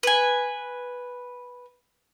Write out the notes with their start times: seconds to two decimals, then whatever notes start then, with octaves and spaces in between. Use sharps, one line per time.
0.03 B4 G#5